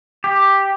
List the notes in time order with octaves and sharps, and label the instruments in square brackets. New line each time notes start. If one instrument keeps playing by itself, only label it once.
[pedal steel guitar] G4